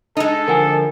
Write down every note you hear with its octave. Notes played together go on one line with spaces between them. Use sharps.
G#3 D#4 A4
D3 F3 A#4 F#5 G#5